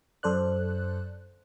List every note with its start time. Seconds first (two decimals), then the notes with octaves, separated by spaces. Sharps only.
0.23 F#2 A4 C5 D5 F#6